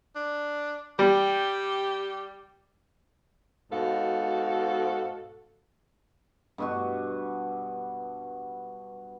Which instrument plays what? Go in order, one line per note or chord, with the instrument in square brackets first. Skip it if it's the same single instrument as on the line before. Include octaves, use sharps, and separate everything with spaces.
[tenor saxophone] D4
[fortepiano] G3 [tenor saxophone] G4
[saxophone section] G#2 B2 F#4 A4 F5
[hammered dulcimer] G2 B2 F#4